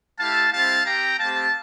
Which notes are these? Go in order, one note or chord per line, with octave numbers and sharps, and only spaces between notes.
A3 E4 G4 F5 A5
G3 C4 E4 G4 F5 A5
C4 G4 G5 A#5
A3 C4 G4 F5 A5